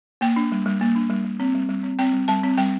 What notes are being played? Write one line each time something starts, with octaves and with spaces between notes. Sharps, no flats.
A#3 G5
D4
G3
G3
A#3
D4
G3
G3
C4
G3
G3
C4
C4 G5
G3
G3 A5
C4
G3 G5